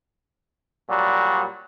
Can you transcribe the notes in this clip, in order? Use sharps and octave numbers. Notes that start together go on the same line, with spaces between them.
A#2 F#3 G3